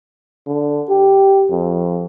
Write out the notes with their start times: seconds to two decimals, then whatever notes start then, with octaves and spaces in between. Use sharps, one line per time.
0.46 D3
0.89 G4
1.51 F2